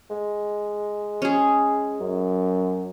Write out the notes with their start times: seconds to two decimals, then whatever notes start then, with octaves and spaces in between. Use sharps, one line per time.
0.10 G#3
1.22 C#4 G#4
2.00 F#2